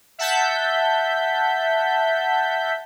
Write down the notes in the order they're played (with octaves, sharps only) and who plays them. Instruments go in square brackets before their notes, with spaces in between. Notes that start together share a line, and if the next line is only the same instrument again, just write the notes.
[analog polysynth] E5 F#5 A5 G6 B6